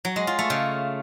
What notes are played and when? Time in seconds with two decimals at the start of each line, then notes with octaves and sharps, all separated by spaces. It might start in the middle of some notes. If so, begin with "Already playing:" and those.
0.05 F#3
0.16 G#3
0.27 F4
0.39 A3
0.50 C#3